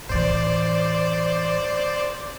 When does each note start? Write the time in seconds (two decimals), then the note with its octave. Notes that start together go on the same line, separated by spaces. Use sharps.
0.09 A2 E3 C5 D5